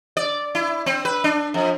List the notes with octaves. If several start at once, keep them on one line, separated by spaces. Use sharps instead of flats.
D5
E4
C4
B4
D4
F2